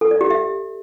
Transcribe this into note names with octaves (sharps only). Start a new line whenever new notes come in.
A4
D5
G4
E5